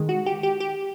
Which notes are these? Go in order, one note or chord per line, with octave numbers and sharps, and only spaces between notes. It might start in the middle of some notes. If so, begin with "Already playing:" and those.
Already playing: D#3 G#3
F#4
G4
G4
G4